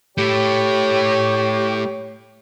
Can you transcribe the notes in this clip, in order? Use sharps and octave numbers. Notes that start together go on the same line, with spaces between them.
A3 E4 G4 C#5